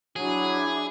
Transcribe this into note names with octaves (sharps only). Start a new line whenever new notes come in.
F#3 D4 E4 G#4